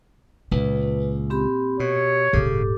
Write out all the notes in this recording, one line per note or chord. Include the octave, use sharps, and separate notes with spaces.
C#2 A#2 B4
C4 G4 B5
B2 G4 C#5
D#1 G#2 C#3 G4 A4 D6